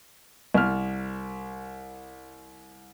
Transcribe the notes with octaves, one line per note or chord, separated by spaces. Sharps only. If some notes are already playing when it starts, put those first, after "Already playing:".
C2 F6